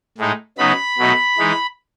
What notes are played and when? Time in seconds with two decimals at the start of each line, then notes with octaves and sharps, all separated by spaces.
0.18 A2 G#3 D#4
0.58 C#3 F#3 B3 D#4 B5
0.98 B2 F#3 A3 D#4
1.38 E3 G#3 D#4